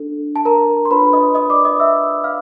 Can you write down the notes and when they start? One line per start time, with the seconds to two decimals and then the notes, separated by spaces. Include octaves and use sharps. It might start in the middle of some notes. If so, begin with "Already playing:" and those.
Already playing: D4 A4
0.36 A5
0.45 A#4 A#5
0.85 C6
0.91 D4 F4 A4 B4 C#5 B5
1.13 D#5 D#6
1.35 D#5 D#6
1.50 D5 D6
1.65 D#5 D#6
1.80 E5 E6
2.24 F5 F6